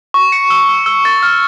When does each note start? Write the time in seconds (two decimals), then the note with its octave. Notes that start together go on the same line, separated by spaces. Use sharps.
0.14 C#6
0.32 C#7
0.50 E6
0.69 E6
0.86 E6
1.05 A6
1.23 F6